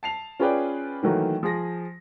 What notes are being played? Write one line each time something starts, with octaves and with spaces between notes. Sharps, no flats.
A5 C7 F7
C#4 F4 G#4 B4 D5 G5
D#3 E3 F#3 A3 A#3
F3 G#4 A#6